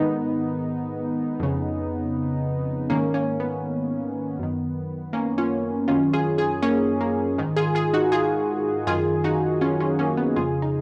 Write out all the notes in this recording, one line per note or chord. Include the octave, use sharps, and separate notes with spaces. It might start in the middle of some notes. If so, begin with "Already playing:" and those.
Already playing: G#2 D#3 B3 D#4
F2 C#3
G#2 D#3 A#3 C#4
A#3 C#4
B3
F#2 D#3
A#3 C#4
C#4 F4
F#2 D#3 C#4 F4
F4 G#4
F4 G#4
A#3 C#4
A#3
G#2 D#3
F4 G#4
F4 G#4
D#4 F#4
F4 G#4
F#2 D#3 F4 G#4
D#4 F#4
C#4 F4
C#4 F4
A#3 C#4
B3
F2 C#3 F4 G#4
D#4